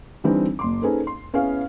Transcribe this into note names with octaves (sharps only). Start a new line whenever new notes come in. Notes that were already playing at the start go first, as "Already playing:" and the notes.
D3 E3 G3 C4 D4 D#4
F#1 C6 D6
C#4 D#4 G#4 A4 B4 C5
C6
B3 C#4 E4 G#4 F5